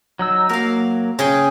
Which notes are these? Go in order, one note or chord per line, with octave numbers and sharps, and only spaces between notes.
F#3 D#4 E6
F#3 A#3 F#4 A#4 F5
C#3 G#4 G5